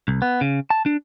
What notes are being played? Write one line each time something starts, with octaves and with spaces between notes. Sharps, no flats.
C2
B3
C#3
A5
D4